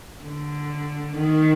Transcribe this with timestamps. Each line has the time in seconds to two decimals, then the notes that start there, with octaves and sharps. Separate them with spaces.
0.24 D3
1.17 D#3